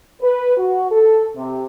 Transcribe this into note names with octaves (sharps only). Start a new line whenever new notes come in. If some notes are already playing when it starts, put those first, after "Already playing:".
B4
F#4
A4
C3